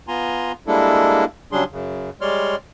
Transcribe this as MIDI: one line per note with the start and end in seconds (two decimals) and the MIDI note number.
0.08 0.52 59
0.08 0.52 65
0.08 0.52 80
0.08 0.52 82
0.08 0.52 84
0.67 1.25 55
0.67 1.25 56
0.67 1.25 58
0.67 1.25 62
0.67 1.25 64
0.67 1.25 69
1.52 1.64 49
1.52 1.64 54
1.52 1.64 55
1.52 1.64 62
1.52 1.64 68
1.52 1.64 84
1.72 2.10 42
1.72 2.10 49
2.21 2.56 55
2.21 2.56 56
2.21 2.56 73
2.21 2.56 74
2.21 2.56 84
2.21 2.56 89